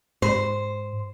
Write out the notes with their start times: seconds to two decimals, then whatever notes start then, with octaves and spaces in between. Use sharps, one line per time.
0.22 G#2 C5